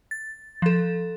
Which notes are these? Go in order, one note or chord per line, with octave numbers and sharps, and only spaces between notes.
A6
F3 A4